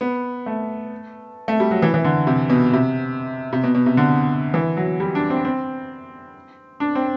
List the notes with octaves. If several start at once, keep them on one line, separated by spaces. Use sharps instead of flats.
B3
A3
A3
G3
F#3
E3
E3
D3
C3
B2
C3
C3
B2
B2
C3
D3
E3
F#3
G3
D4
C4
C4
D4
C4